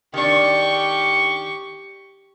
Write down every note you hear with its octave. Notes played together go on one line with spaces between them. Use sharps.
D#3 D4 G4 C#6